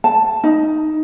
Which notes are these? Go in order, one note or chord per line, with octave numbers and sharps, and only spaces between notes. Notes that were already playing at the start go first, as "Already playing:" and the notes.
A5
D#4